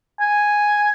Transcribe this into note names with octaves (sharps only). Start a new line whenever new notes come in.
G#5